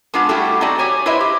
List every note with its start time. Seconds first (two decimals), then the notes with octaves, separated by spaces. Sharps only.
0.14 G#3 B3 D4 F4 B4 F#5
0.29 G3 A3 E4 F#4 G4 A4
0.61 C4 D#4 F#4 D5
0.79 G4 C#5 G#5
1.06 E4 B4 C5 D#5 E5
1.20 G4